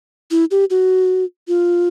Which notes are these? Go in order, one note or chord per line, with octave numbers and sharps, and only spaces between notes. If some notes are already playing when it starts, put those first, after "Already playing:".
E4
G4
F#4
F4